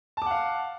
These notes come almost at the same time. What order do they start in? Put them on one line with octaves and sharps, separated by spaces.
A5 D6 F#5 F5